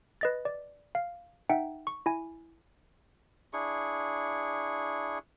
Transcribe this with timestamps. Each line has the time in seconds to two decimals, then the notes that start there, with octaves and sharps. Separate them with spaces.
0.21 B4 D#5 A6
0.45 D5
0.95 F5
1.49 D#4 E5 F#5 G5
1.87 C#6
2.06 E4 G#5
3.53 D4 E4 G#4 C#6